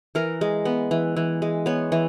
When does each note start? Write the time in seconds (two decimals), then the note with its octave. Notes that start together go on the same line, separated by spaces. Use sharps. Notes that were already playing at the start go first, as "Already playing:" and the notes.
0.15 E3 A#4
0.41 G#3
0.65 B3
0.91 E3
1.16 E3
1.42 G#3
1.66 B3 C#5
1.92 E3